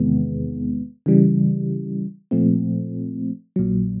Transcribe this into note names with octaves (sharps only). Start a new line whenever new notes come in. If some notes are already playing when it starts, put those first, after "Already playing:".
Already playing: E2 C3 D#3 G#3 B3
C#3 E3 G3
A#2 F3 A3 C4
A#1 A#2 F#3